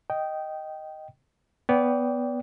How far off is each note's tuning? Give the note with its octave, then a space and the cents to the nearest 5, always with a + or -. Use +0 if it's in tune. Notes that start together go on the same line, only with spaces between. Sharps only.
D#5 +0 G5 -10
B3 +0 D5 -30 G5 +0